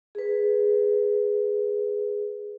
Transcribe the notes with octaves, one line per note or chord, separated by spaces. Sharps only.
G#4 B4